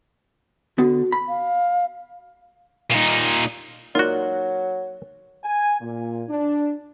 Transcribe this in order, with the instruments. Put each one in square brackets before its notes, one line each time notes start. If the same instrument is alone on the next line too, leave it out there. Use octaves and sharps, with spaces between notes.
[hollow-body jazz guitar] D3 B3 [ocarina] F#4
[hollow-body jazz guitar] B5
[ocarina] F5
[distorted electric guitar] A#2 D#4
[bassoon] F#3 [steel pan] A#3 D#4 D5 [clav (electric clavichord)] F4 F#4 [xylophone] A#4
[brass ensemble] G#5
A#2
D4